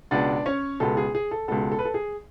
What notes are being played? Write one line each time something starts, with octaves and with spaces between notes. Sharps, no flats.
C#2 B2 G#3 B3 D4 D5
C#4 C#5
C#2 B2 G#3 B3 A4
G#4
G#4
A4
C#2 B2 G#3 B3 A4
A4
B4
A4
G#4